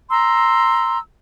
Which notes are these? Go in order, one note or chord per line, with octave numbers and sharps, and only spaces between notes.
A#5 C6 E6